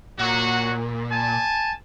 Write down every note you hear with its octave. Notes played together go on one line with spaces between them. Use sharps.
A#2 F#3 F#4
G#5 A5